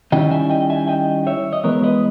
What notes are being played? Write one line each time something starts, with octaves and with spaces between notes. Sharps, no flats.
D#3 G3 C#4 E4 D#5 G5
E5 G#5
D#5 G5
E5 G#5
D#5 G5
C#5 E5
D#5
E3 G#3 B3 A#4 C#5
B4 D#5